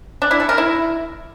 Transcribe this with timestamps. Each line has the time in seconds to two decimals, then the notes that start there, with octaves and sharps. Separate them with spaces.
0.22 D4
0.31 E4
0.40 A4
0.49 A#4
0.58 E4